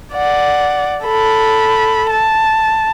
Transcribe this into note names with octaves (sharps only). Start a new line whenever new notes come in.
D5 F#5
A4 B5
A5